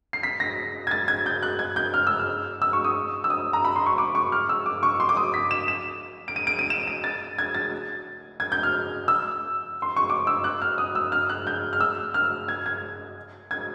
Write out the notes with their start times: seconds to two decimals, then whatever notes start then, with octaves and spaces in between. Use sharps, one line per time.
0.13 C7
0.23 B6
0.40 A#6
0.87 G#6
0.91 A6
1.08 G#6
1.26 G6
1.43 F#6
1.59 G#6
1.76 G6
1.94 F6
2.07 E6
2.20 F6
2.62 E6
2.73 C#6
2.84 D#6
3.24 E6
3.30 D#6
3.53 A#5
3.65 B5
3.76 C6
3.86 C#6
3.98 D6
4.15 C#6
4.32 F6
4.49 E6
4.66 D6
4.83 C#6
5.00 C6
5.09 D6
5.17 D#6
5.34 B6
5.51 E7
5.68 E7
6.28 D7
6.36 D#7
6.47 D7
6.59 D#7
6.70 E7
6.87 D#7
7.04 A6
7.38 G#6
7.54 A6
8.40 G#6
8.52 G6
8.63 F6
9.08 E6
9.82 C6
9.96 C#6
10.10 D6
10.27 E6
10.44 F#6
10.62 F6
10.78 D#6
10.95 E6
11.12 F6
11.29 F#6
11.47 G6
11.73 F6
11.80 E6
12.14 F6
12.48 G#6
12.66 G#6
13.51 G#6